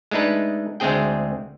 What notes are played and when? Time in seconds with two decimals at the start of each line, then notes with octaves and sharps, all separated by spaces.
0.11 G#3 A3 D4 D#4 B4
0.80 D2 G#3 A3 C4 G#4 G5